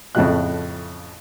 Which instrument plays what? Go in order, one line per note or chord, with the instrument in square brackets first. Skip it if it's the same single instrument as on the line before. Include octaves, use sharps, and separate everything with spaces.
[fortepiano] F2 A2 C#3 F3 D#5 F#6